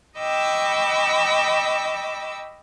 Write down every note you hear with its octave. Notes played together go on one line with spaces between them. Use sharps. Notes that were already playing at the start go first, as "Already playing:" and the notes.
D#5 G5 B5 C#6 D6 E6